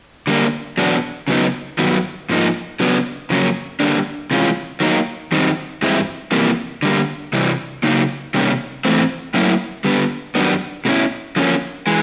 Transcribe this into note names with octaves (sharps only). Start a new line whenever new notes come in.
D3 G3 A#3 D4
E2 B2 F#3 B3 D4
C#3 F#3 B3 D#4
G2 D#3 F#3 B3
G#2 F3 A#3 D#4
C#3 F#3 B3 D4
F2 C#3 F#3 A#3 C#4
D3 G3 A#3 D4
C3 E3 G#3 C#4 F4
D#3 F#3 A#3 D#4
F#2 D#3 G3 C4 D#4
G2 E3 G#3 C4 E4
F2 C3 E3 G3 A#3
D3 G3 A#3
C3 E3 G3
C#3 F#3 A#3 D#4
C3 D#3 G3 A#3 C#4
G#2 E3 A3 C4
A2 F#3 A#3 C#4 E4
D3 G3 B3
F#2 D#3 G3 B3 D4
B2 G#3 C#4 E4
D3 F3 A#3 C#4
E3 G#3